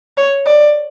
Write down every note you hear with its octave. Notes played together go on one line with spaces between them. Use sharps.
C#5
D5